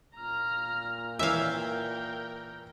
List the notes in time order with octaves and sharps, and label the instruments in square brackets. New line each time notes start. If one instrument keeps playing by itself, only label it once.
[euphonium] A#2 [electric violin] A#5 F6
[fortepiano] E3 E4 C#5 [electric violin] A#4 G5 [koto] E5 F5